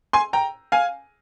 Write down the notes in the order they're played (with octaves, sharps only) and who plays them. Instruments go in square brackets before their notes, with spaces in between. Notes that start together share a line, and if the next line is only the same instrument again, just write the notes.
[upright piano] G#5 C6
G5 A#5
F5 G#5